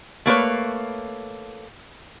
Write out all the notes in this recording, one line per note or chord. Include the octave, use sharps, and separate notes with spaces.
A3 A#3 B4 C#5